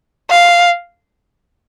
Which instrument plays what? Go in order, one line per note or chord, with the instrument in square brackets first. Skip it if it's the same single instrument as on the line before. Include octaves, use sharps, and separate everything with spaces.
[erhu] F5